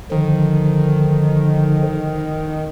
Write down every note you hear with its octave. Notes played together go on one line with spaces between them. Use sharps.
D3 D#3 F3